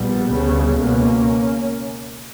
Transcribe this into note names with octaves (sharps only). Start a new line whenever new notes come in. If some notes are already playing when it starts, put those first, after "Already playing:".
Already playing: A#1 A#2 G3 B3
D2 C#3
C#2 B2 A#3 C#4